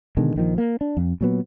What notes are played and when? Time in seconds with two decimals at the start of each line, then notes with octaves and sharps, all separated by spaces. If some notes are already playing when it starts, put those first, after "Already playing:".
0.17 B2 D3 D#3 G#3
0.36 A#1 D#3 F3
0.58 A#3
0.81 D4
0.97 F2
1.21 A#2 F#3 B3